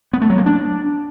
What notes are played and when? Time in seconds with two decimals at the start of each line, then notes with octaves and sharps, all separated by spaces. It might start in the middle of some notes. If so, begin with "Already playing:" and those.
0.13 B3
0.22 A3
0.30 F#3
0.38 A#3
0.46 D4